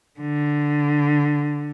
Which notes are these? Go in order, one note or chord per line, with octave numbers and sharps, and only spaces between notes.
D3